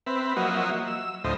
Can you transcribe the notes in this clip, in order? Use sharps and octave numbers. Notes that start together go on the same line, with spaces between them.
C4 B4 E5
F3 F#3 A#3 F#4 D#5 E5
E6
D2 A2 F3 C5 D#5